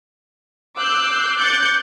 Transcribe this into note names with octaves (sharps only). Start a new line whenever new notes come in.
D6 E6 F#6 G6 C7
D6 F#6 G6 A6 C#7